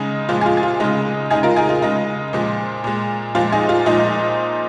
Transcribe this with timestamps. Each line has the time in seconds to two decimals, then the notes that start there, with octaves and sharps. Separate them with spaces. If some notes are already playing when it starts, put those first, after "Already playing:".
Already playing: C#3 G#3 D#4 G#4
0.29 A#2 F3 G#3 F4
0.41 G#4
0.46 F4
0.57 G#4
0.63 F4
0.80 C#3 G#3 D#4
1.30 C#3 D#4 G#4
1.34 G#3
1.43 F4 A#4
1.56 D#4 G#4
1.69 F4
1.82 C#3 G#3 D#4
2.33 A#2 F3 G#3
2.84 A#2 G#3
3.35 A#2 F3 G#3 F4
3.52 D#4 G#4
3.69 F4
3.86 A#2 F3 G#3 D#4